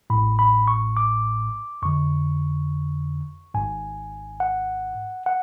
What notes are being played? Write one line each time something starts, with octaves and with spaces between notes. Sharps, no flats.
A1 A2 B5
B5
C#6
D6
F2 D3 C#6
G#1 G#2 G#5
F#5
F#5